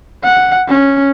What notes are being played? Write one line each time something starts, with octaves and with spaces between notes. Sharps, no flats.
F#5
C#4